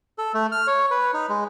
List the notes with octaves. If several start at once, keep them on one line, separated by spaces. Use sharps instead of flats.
A4
A3
F6
C#5
B4
D#4
G#3